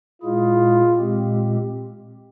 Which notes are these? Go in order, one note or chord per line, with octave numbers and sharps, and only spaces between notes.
A#2 G#3 E4 F4 G#4
A#2 G#3 C4 G4